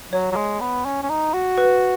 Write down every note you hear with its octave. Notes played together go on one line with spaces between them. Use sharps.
F#3 C#5
F#3
G#3
B3
C#4
C#4
D#4
F#4
B4